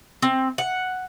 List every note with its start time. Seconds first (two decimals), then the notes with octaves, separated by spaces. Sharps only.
0.22 C4
0.58 F#5